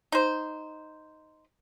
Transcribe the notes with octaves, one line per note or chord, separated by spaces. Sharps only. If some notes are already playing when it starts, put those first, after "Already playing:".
D#4 C5